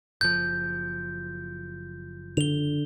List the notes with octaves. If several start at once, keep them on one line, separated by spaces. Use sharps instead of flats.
F#1 F3 G6
D3 F7 G7